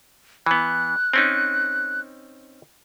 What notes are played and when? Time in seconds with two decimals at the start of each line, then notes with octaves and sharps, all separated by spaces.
0.46 E3 B3 F#6
1.14 C4 C#4 D#4